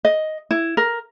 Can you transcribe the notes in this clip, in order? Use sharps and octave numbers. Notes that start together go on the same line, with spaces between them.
D#5
E4
A#4